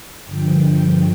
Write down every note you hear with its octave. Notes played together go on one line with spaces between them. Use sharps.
G2 D3 F3 G5